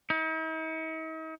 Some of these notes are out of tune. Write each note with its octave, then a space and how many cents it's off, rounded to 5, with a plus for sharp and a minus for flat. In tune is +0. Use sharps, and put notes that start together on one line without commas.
D#4 +45